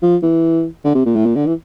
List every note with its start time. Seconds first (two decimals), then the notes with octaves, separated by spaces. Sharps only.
0.02 F3
0.23 E3
0.84 D3
0.95 C3
1.06 A#2
1.16 A2
1.26 A#2
1.36 D3
1.46 E3